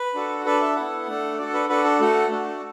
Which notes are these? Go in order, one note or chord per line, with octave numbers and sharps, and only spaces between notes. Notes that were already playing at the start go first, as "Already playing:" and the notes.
Already playing: B4
D4 F#4 A4
D4 A4 B4
E5
B3 E4 A4 F#5
A3 D4 A4
D4 F#4 A4 D5
B4
D4 F#4 A4 B4
A4
A3 F#4 A4
A3 D4 F#4